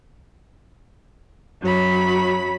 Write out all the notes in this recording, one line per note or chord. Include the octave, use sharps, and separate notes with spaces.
F#2 F#3 B5